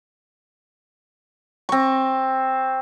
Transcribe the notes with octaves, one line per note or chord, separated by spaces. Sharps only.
C4 C#6